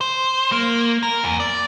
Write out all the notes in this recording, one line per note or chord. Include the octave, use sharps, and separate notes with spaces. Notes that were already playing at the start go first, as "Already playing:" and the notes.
C5
A#3
A#4
E2
D5